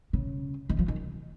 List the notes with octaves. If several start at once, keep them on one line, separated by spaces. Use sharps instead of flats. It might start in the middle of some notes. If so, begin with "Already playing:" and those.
C#3
D#3
F3
D#3